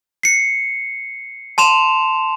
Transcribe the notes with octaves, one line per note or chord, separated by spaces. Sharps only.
C7 C#7
A5 C6 E7 F7